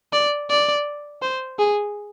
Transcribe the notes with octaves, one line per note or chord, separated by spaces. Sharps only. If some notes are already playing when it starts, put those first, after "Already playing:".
D5
D5
C5
G#4